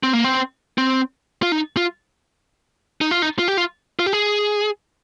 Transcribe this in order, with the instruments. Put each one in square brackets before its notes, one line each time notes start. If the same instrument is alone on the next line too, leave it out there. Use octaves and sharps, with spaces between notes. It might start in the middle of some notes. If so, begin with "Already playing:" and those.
[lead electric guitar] C4
A#3
C4
C4
F4
D#4
F4
D#4
F4
D#4
F4
G4
F4
F4
G4
G#4